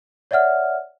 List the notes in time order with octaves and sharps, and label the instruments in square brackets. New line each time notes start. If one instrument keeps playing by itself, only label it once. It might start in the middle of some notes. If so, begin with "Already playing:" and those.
[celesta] C#5 D5 E5 F#5 F6